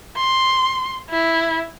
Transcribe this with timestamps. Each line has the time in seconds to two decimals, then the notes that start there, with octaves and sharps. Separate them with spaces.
0.16 C6
1.10 E4